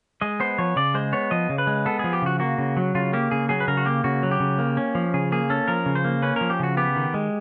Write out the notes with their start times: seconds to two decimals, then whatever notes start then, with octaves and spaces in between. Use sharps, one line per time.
0.21 G#3 D#5
0.40 B3 C5
0.58 F3 C#5
0.76 C#3 D5
0.94 G#3 C5
1.13 B3 C#5
1.31 F3 D#5
1.49 C#3
1.58 B4
1.67 G#3
1.86 B3 A4
1.99 F3 G#4
2.13 G4
2.22 C#3 F#4
2.40 A#3 F#4
2.58 C#3
2.77 F#3
2.95 C#3 F4
3.13 A#3 G4
3.31 C#3 G#4
3.49 F#3 G#4
3.60 B4
3.68 C#3 A#4
3.77 F#4
3.86 A#3 G4
4.04 C#3 F#4
4.23 F#3
4.31 G4
4.40 C#3
4.59 A#3
4.77 C#4
4.95 F3
5.14 C#3 G#4
5.32 A#3 G#4
5.50 C#4 A4
5.68 F3 A#4
5.86 C#3
5.95 C5
6.04 A#3
6.22 C#4 B4
6.36 F3 A#4
6.50 G4
6.60 C#3 F#4
6.77 B3 G4
6.96 D#3
7.14 G#3